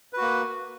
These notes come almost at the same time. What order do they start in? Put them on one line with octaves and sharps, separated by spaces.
B4 F#4 A#3